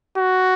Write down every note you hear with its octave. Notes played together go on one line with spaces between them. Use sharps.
F#4